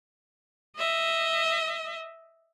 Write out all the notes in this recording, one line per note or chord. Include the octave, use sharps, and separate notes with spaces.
D#5 E5